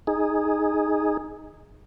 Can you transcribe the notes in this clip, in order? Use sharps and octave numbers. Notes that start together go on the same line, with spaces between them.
D#4 G#4